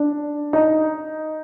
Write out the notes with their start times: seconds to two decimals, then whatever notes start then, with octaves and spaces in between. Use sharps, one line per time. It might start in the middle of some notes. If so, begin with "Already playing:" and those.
Already playing: D4
0.53 D#4